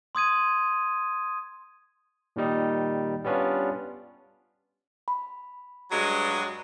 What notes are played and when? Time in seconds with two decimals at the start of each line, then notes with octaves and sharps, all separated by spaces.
0.15 C6 D#6 G#6 D#7
2.36 A#2 D#3 G3 D#4
3.25 G3 B3 C#4 D4 F4
5.08 B5
5.91 G2 F#3 G#3